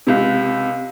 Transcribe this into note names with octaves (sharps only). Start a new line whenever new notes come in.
C#2 C3